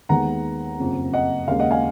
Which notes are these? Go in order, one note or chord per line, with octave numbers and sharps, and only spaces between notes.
D#2 D#3 G#3 B3 F#5 A#5
F#1 F2 C#3
D#5 F#5
D#2 C#3 G#3 F5
D#5 F#5
F5 G#5